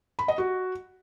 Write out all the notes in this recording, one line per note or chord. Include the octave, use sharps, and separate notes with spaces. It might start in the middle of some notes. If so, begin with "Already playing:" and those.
B5
D#5
F#4